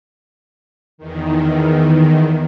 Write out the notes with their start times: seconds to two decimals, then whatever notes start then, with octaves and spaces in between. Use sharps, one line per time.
0.98 E2 D#3